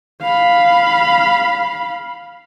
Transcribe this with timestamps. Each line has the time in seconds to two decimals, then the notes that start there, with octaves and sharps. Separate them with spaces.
0.22 F5 B5